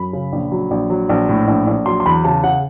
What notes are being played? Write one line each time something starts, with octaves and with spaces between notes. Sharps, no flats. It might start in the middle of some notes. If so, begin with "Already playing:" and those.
Already playing: F#2 B5
C#3
A#1
F#3
A#1
F#3
A#1
A2
A#1
A#1
F#3 C6
C6
E2 B5
C#3 A5
C#3 F#5